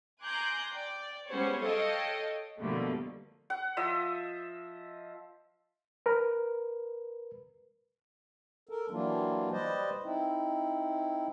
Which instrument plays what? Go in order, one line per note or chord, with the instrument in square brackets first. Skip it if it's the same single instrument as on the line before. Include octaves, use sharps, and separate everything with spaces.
[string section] G#5 A#5 C6 D6 F#6 G6
D5 G5
G3 G#3 B3 C#4 C5 C#5
A4 C#5 D#5 F5 G5 A5
B2 D3 F3 G3 A3 A#3
[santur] F#5
F3 D#5 E5
[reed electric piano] A#4 B4
[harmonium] A4 A#4
E3 F#3 G3 A#3 D4 F4
G3 B4 C5 D5 D#5
C4 D#4 E4